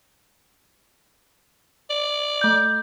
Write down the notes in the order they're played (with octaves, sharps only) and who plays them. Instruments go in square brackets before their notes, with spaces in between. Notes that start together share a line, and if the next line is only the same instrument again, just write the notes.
[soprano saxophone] D5
[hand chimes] A3 G6